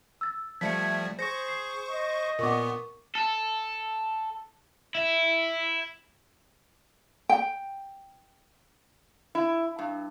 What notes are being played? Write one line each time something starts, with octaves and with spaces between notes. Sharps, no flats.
E6 A6
F3 G3 A3 G#6 B6 C#7
G#4 C5 C#6 A#6 C#7
C7
D#5
A#2 B3 A#4 C#6 D6
A4
E4
G5
E4
G2